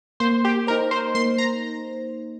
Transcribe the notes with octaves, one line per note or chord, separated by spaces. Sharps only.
A#3 C5
G4
D#4 A#4 C5
C5
A#3 C6
A#5